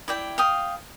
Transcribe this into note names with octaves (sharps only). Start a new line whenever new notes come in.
E4 D5 G5
F5 G5 D#6